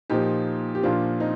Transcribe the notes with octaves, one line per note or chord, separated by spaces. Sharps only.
A#2 F3 D#4 G4
G4
A#2 F3 D4 F4
C4 D#4